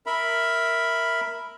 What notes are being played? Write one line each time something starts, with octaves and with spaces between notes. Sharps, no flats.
A#4 E5 B5